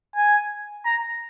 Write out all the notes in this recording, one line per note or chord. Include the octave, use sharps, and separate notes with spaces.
G#5
A#5